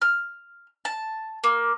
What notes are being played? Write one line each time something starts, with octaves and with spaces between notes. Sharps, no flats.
F6
A5
A#3